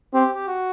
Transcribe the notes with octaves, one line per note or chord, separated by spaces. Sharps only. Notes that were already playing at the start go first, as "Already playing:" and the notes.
C4 G4
G4
F#4